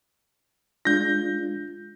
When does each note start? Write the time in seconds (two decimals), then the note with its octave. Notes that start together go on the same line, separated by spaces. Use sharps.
0.85 G#3 D4 F4 G6 A#6